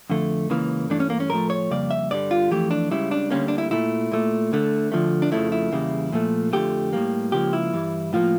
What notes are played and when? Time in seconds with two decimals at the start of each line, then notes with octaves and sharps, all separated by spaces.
0.10 F2 D3 A3
0.50 C#2 C#3 E3 A#3
0.90 G2 E3 A3 D4
1.00 C#4
1.10 A#3
1.20 C#4
1.30 A2 F3 A3 A#4
1.50 C#5
1.70 F2 C#3 G3 A#3 D5
1.91 E5
2.11 G2 D3 G3 D5
2.31 F4
2.51 F2 E3 A3 G4
2.71 D4
2.91 C#2 C#3 G3 E4
3.11 D4
3.30 D2 D3 G3 A#3 C#4
3.48 D4
3.58 E4
3.71 A#2 A3 E4
4.12 A#2 A3
4.52 D2 D3 A3
4.92 D2 D3 F3 A3
5.22 D4
5.32 F2 C#3 F3 A3 E4
5.52 E4
5.72 E2 C#3 G3 A#3
6.12 A#2 F3 A3
6.53 F2 D3 F3 A3 G4
6.93 A2 G3 A#3
7.32 C#2 C#3 F3 A#3 G4
7.53 E4
7.73 G2 E3 G3
8.13 A2 F3 A#3 F4